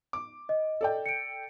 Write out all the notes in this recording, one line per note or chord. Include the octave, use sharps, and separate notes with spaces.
D6
D#5
A4 D5 G5
C#7 D7